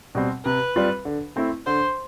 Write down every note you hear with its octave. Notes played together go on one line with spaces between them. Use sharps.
B2 G3 C4
C3 B4
G3 C4 F4
D3
A3 C4 E4
D3 C5